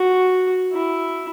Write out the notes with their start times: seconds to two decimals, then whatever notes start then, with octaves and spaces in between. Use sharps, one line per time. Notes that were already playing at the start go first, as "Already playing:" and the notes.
Already playing: F#4
0.73 E4